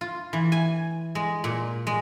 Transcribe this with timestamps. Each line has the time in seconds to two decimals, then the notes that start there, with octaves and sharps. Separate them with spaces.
0.01 F4
0.33 E3
0.52 G#5
1.15 G#3
1.44 A#2
1.87 G#3